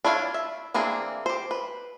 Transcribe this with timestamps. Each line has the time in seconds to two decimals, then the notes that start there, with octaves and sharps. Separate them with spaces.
0.05 D4 E4 F4 C#5 F5
0.34 E5
0.74 E3 A#3 C4 D4 G#4
1.26 G4 C5
1.51 B4